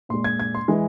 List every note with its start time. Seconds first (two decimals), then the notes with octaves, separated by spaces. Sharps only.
0.09 A#2 G#3 C6
0.24 G#6
0.40 G#6
0.55 C6
0.68 E3 G#3